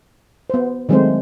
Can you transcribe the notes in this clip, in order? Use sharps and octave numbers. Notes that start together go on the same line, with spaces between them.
B3 C5
D#3 F#3 G#3 A3 C4 C5